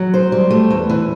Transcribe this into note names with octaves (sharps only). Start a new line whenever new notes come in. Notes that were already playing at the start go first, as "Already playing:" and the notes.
Already playing: F#3
C5
G3
A3
E2
E3